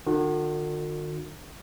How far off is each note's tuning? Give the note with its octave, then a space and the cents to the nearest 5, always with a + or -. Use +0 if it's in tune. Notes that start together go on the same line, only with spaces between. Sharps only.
D3 +45 F#4 -45